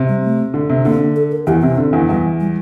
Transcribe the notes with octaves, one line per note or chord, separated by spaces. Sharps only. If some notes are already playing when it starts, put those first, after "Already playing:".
Already playing: C3
G3
A3
D3
C3
D3 A#3
A4
A#4
E2 E3 G4
C3 C4
D3
E2 E3
E2 E3 G3
G3